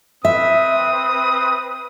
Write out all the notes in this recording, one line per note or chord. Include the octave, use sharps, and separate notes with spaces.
C4 B4 E5 D#6